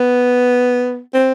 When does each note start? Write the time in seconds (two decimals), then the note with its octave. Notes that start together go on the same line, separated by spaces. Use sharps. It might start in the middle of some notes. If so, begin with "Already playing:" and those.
Already playing: B3
1.14 C4